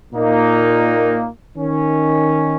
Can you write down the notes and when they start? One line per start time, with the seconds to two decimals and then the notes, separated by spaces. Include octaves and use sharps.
0.13 A#2 A#3 D#4
1.57 D#3 C#4